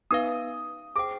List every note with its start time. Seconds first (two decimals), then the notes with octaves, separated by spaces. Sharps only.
0.11 B3 D#4 B4 F5 D#6
0.96 G#4 C5 G5 D6